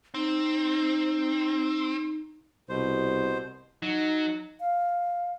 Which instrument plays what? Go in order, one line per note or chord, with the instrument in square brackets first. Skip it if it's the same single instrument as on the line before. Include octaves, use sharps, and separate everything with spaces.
[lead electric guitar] C4 [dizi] D#4
[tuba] C2 [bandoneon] B2 C5
[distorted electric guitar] F#3 [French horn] D#4
[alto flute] F5